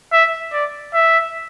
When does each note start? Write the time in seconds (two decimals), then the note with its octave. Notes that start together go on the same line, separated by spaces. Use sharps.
0.12 E5
0.53 D5
0.94 E5